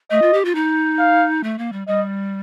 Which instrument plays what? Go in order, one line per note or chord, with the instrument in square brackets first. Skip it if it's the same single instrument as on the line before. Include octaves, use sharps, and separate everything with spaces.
[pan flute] A3 [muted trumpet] D#5
[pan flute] F4
G4
F4
D#4
[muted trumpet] F5
[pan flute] A3
A#3
G3
[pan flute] G3 [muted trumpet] D#5